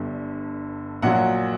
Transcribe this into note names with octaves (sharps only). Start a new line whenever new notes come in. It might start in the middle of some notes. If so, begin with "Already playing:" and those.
Already playing: G1 G2 D3
A#1 A#2 F#3 F#5